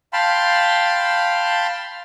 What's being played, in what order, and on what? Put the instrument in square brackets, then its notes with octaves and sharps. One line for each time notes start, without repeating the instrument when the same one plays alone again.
[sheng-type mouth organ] F5 G5 A5 B5 C6